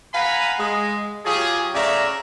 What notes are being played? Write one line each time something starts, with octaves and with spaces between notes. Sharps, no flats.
B4 F5 F#5 G#5 A#5 B5
G#3
F#3 F4 G4 G#4
C#3 A3 D5 E5 F5 A#5